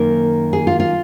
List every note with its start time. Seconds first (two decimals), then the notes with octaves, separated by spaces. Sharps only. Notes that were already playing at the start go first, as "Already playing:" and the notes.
Already playing: F#2 D#3 A#3 A#4
0.53 G#4
0.67 F4
0.80 F4